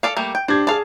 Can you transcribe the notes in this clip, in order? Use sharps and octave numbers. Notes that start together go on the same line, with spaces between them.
A4 D5 F5
G3 A3 A#3
G5
D4 G4 C5 G#6
G#4 D5 F5 A5